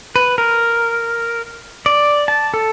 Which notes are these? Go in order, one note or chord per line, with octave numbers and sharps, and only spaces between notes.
B4
A#4
D5
A5
A4